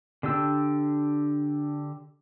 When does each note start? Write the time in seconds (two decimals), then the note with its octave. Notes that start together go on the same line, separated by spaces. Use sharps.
0.23 D3 D4 G4 E6